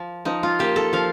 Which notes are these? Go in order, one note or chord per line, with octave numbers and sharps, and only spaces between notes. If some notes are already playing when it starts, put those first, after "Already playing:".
Already playing: F3
F3 D#4
F4
A#3 G4
A4
F3 F5